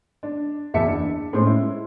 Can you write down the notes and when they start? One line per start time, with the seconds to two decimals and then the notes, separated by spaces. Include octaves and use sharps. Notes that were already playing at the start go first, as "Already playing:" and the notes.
0.23 D4
0.74 F#1 E2 E5 A5 C#7
0.87 D4
1.33 A2 G#3 C#4 C5 C6
1.47 E4